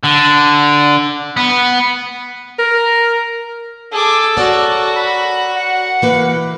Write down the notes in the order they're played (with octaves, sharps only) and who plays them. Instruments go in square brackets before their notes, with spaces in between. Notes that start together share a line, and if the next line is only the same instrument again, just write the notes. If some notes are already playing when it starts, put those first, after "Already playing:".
[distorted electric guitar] D3
B3
[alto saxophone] A#4
[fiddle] G#4 D6 [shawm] A4
[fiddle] F#4 [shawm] A4 [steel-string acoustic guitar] A#4 C#5 D5
[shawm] B5
F#5
[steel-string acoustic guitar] E3 A#3 B4